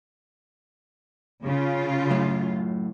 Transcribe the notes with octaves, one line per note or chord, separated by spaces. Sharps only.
C#3 F4
F#2 A2